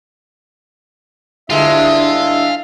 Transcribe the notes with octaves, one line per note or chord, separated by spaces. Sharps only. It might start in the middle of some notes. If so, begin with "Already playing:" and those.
G2 D3 G#3 D4 E4 E5 F5 C6